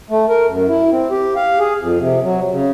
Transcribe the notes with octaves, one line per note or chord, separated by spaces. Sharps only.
A3
A#4
F#2
E4
C4
G4
F5
G#4
F2
C3
F#3
C#3